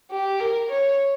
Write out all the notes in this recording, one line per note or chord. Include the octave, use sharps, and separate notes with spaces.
G4
A#4
C#5